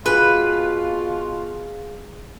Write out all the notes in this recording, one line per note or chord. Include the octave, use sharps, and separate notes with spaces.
B2 F4 G#4 B4 F5